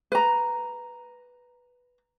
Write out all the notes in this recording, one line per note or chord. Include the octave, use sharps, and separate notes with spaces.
B4 A#5